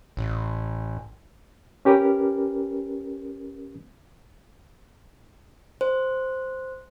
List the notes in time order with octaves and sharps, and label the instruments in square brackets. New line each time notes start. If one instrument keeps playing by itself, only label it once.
[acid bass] A1
[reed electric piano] C#4 G4 A#4 B4
[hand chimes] C5